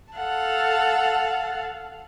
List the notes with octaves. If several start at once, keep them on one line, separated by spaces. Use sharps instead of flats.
A4 F5 F#5 A5